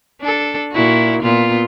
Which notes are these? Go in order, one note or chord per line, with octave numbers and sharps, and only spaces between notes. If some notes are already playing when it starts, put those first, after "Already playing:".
D4 A4
A#2 E4 F#4
A#2 B3 F4